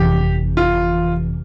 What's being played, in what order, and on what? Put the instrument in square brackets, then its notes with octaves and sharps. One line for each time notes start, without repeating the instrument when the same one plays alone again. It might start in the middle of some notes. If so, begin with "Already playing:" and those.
Already playing: [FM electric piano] G1 F2 C3 E3 [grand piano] G4
[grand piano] F4